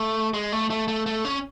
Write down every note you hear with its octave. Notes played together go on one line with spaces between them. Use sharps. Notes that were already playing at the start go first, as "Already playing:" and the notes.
Already playing: A3
G#3
A3
A3
A3
A3
C#4